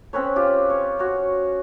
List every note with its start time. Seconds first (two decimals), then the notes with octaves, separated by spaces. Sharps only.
0.13 C4 C#4 B4 C#5
0.36 F4 G4
0.70 C#5
0.99 F#4 C#5